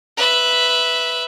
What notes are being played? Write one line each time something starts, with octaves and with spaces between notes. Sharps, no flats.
B4 E5